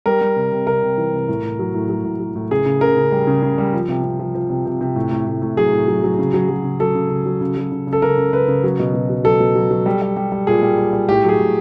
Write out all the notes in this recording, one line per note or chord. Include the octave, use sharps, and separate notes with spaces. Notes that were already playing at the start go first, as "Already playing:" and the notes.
G3 A#4
G3
C3
C3
C3 A#4
C3
E3
C3
A2
A2
F#3
A2
F#3
A2
F#3
A2
C#3 G#4
C#3
C#3 A#4
C#3
G3
C#3
C#3
G3
F3
C3
C3
F3
F3
C3
C3
C3
A2
A2
A2
A2
F#3 G#4
A2
F#3
F#3
C#3
F#3
F#3
C#3
F#3 A4
C#3
C#3
F#3
C#3
F#3
C#3
C#3
A4
C#3 A#4
C#3
C#3 B4
C#3
F#3
B2
B2
F#3
F#3 A4
B2
F#3
F#3
G3
G3
G3
G3
A#2 G#4
G3
G3
G3
A2 G4
F#3 G#4
A2